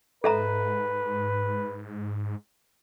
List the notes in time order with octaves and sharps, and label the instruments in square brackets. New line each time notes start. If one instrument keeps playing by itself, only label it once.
[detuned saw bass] G#2 [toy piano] A4 E5 A#5 [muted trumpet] B4